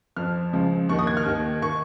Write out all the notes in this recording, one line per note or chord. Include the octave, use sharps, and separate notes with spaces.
F2 F3 F6
C#2 C#3 F3
D#2 D#3 C#6
D#6
G#6
F6
D#2 D#3
D#3 C#6